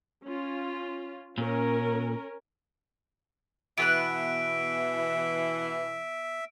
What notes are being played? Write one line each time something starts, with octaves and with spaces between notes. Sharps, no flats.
C#4 F4
A#2 C#4 A#4
B2 E3 B3 B4 E5 F#6 D7